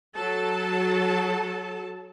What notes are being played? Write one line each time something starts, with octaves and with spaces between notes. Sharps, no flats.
F#3 A4 A5